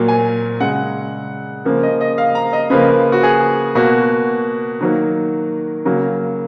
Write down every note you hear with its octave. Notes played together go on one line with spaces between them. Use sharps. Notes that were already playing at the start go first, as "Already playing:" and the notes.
Already playing: A#2 F#3 A#3
G#5
C#3 G#3 F#5
C#3 F3 A#3
D#5
D#5
F5
A#5
D#5
C#3 F3 A#3 B4
F#4
G#4
B2 A#3 F#4
D#3 F#3 A#3
C#3 F#3 A#3